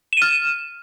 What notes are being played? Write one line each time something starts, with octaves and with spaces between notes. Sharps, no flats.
F6 D#7 E7